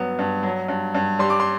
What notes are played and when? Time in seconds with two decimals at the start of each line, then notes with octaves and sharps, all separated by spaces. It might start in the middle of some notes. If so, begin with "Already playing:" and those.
Already playing: G2 F#3 B3
0.19 G2
0.43 F#3
0.68 G2
0.95 G2
1.19 G3 C6
1.30 D6
1.40 C6